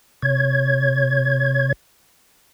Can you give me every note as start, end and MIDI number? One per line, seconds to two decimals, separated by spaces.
0.22 1.73 48
0.22 1.73 73
0.22 1.73 92